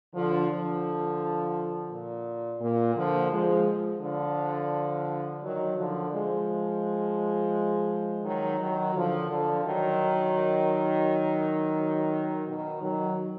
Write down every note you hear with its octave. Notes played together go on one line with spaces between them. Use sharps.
D3 F3
D3 F3
A#2
A#2
D3 F3
F3 G#3
D3 F3
D#3 F#3
D3 F3
F3 G#3
D#3 F#3
D#3 F#3
D3 F3
D3 F3
D#3 F#3
B2 D#3
D#3 F#3